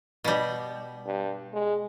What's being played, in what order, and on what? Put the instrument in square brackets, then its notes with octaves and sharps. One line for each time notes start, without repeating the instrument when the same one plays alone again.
[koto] B2 G3
[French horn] G2
G#3